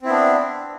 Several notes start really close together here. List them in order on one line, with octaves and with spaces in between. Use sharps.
C4 E4 B3 D4